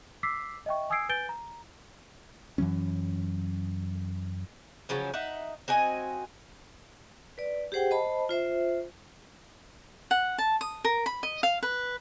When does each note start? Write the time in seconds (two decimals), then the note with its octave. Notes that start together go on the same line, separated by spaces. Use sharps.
0.23 D6 E6 B6 C7
0.66 D#5 E5 G5 C#6
0.90 G#5 D#6 E6 G#6 C7 D7
1.09 B4 G#5 G6 A6 D7 G7
1.29 A#5
2.58 F#2 E3 F#3 C#4
4.89 C#3 F3 F#3 C#4
5.14 D#4 E5 F#5
5.68 C4 F#4 D#5 G#5
7.38 B4 D5
7.72 G4 G#4 C5 F#5 G5
7.91 C5 D#5 A5 B5
8.29 F4 C5 E5
10.11 F#5
10.38 A5
10.61 D#6
10.85 A#4
11.06 B5
11.23 D#5
11.43 F5
11.63 B4